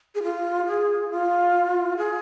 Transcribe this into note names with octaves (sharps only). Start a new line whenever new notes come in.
G#4
F4
G#4
F4
G#4